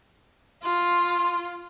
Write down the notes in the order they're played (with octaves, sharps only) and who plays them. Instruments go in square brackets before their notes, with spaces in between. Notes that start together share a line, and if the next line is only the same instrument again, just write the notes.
[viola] F4 [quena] C6